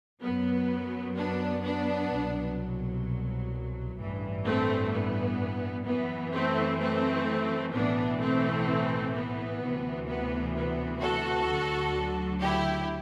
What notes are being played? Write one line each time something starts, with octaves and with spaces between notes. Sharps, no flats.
F#2 F#3 B3
B3 D4
B3 D4
C2 B2 F#3
A1 G2 E3
A3 C4
B3
F#2 E3 B3
A3 C4
A3 C4
B1 A2 E3 B3 D4
A3 C4
B3
D2 C3 E3
B3
B3
F#4 A4
D2 D3 F#3
E4 G4